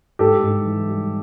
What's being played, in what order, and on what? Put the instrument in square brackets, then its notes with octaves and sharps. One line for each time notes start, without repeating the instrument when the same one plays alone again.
[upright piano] G#2 G4 A4
G#2
E3
G3